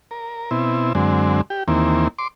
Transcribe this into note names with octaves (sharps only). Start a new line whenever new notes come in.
A#4
B2 C4 E4
F#2 D3 G#3 C4
G4
D#2 E3 A#3 C4
C6 D6